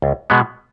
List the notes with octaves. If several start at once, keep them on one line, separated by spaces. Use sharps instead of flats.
C#2
B2 G#3 B3